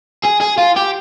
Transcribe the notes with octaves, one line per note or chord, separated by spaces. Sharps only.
G#4
G#4
F4
G4